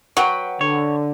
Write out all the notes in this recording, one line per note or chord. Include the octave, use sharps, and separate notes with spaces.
F#3 B4 F#5 G5
D3 C#5